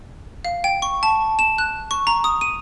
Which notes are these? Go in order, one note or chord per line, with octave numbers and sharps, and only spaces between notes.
F5
G5
C#6
A5
E7
F#6
C#6
A#5
D#6
D#7